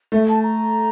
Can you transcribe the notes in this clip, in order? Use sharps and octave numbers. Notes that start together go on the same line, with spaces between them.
A3 E5
A5
A#5